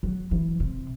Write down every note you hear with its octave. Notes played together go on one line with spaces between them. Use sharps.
F#3
E3
C3